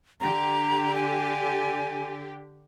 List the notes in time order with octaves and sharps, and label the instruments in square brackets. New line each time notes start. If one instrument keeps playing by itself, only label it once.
[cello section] D3 G4 [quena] A#5
[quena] G#5